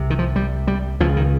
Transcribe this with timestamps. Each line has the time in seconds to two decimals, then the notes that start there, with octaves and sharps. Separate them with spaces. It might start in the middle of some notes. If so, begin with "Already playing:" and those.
Already playing: C2 C3
0.10 D#3
0.19 F3
0.36 G3
0.67 G3
1.00 C#2 C#3 F3
1.17 D#3